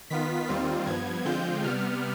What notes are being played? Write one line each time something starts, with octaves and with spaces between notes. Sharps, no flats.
D#3 B3 F4 B6
D#2 D#3 G3 C4 F4
G2 F3 B3 G#6
D3 F3 G#3 C4 F4 G6
C3 G3 B3 F6